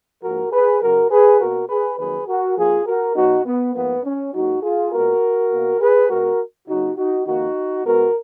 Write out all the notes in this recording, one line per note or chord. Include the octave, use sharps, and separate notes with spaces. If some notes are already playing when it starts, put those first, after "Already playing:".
G#2 F3 A#3 F#4 A#4
G#4 B4
F#2 C#3 F#3 F#4 A#4
G#4 B4
B2 A#3 F#4 A#4
G#4 B4
F2 D#3 F#3 A#3 G#4 B4
F#4 A#4
F2 F3 A#3 F4 G#4
F#4 A#4
B2 F#3 B3 D#4 F#4
B3
G#2 F3 A#3 B3
C#4
G#2 F#3 A#3 D#4 F#4
F4 G#4
A#2 G#3 B3 F#4 A#4
B2 A#3
G#4 B4
B2 G#3 B3 F#4 A#4
C#3 F#3 A#3 D#4 F#4
D#4 F#4
F2 D#3 A#3 D#4 F#4
B2 G#3 B3 F#4 A#4